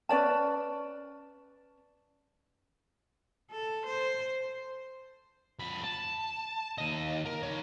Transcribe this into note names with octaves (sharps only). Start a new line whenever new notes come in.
C#4 B4 D5 A5
A4
C5
F2 B5
A5
D#2 D#5
A#4
D#4 C#5